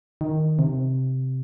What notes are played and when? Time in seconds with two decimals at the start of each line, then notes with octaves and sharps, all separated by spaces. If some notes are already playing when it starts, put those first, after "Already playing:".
0.21 D#3
0.59 C3